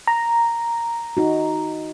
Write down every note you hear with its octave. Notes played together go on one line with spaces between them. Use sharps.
A#5
D#4 F#4